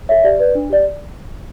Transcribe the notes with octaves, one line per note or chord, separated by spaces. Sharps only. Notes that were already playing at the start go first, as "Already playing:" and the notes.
A4 C#5 E5
G4 D5
B4 D5
D4
G4 D5